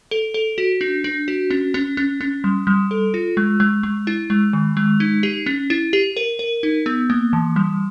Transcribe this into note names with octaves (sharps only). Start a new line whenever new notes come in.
A4
A4
F#4
D4
D4
F#4
C#4
C#4
C#4
C#4
G3
G3
A4
F4
G#3
G#3
G#3
E4
G#3
D#3
G#3
D#4
G4
C#4
E4
G4
A#4
A#4
D#4
B3
A#3
E3
G3